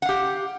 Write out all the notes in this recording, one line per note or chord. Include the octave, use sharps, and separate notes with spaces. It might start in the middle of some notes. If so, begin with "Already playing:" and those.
G4 F5 F#5